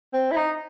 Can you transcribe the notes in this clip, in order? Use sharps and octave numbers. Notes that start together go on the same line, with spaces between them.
C4
E4
D#4